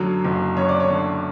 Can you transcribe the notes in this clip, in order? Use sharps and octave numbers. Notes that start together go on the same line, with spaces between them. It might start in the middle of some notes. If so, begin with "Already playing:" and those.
Already playing: F#2 D3 F#3
F#1
F#2 C#5
D5
C#5
D3